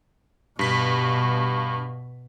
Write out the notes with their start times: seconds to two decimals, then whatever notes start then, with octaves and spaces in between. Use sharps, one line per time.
0.59 G2 B2 B6